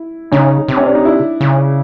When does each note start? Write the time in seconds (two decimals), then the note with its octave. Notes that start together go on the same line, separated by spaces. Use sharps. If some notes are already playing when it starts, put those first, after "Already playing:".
Already playing: E4
0.32 C#3 C#4 D#4
0.68 C3
0.77 C#4
0.86 D4
0.95 D#4
1.05 D4 E4
1.41 C#3